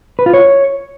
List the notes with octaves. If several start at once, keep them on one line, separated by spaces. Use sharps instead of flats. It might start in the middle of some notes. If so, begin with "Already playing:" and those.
B4
F4
C#5